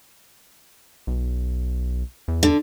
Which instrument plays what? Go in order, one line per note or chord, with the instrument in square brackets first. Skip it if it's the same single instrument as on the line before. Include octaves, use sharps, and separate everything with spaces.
[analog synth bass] B1
E2
[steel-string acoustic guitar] D3